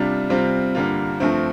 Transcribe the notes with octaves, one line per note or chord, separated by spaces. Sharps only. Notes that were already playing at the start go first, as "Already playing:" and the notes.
Already playing: C3 G3 D4 F4
C3 G3 C4 F4
G2 D3 G3 A#3 F4
G2 F3 A3 C4